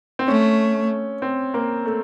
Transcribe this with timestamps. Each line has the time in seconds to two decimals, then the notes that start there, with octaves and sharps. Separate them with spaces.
0.19 C4
0.28 A3 C#4
1.22 C4
1.54 A#3
1.86 A3